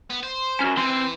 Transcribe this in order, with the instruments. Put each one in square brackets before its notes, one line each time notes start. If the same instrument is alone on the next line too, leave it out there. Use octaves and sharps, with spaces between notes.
[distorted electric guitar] B3
C5
[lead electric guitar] C#4 F#4
[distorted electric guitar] E3 [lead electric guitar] C4 C6